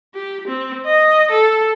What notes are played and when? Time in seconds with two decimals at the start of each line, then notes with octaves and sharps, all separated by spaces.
0.15 G4
0.48 C4
0.86 D#5
1.31 A4